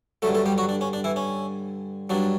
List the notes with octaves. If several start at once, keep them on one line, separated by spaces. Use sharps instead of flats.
G2 D3 F#3 A3 A4
A3 A4
G3 G4
F#3 F#4
D4
C#4
D4
E3 E4
C#4
G2 F#3 D4